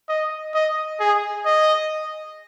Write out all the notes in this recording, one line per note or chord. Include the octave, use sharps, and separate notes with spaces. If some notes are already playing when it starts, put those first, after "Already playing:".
D#5
D#5
G#4
D#5